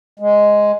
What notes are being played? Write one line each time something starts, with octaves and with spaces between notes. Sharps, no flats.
G#3